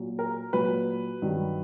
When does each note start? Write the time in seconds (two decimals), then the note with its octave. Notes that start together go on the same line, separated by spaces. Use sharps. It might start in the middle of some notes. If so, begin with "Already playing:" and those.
Already playing: A#2 F#3
0.19 A#4
0.53 A#2 F#3 B4
1.22 G2 D#3 F#3